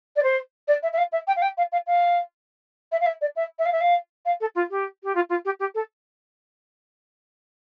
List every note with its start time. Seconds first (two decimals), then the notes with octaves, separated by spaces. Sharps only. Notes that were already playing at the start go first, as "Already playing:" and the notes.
0.16 D5
0.23 C5
0.67 D5
0.83 E5
0.93 E5
0.98 F5
1.12 E5
1.27 G5
1.36 F5
1.42 G5
1.57 F5
1.72 F5
1.87 F5
2.92 E5
3.00 F5
3.06 E5
3.21 D5
3.36 E5
3.59 E5
3.65 F5
3.72 E5
3.81 F5
4.25 F5
4.40 A4
4.55 F4
4.70 G4
5.03 G4
5.15 F4
5.29 F4
5.45 G4
5.59 G4
5.74 A4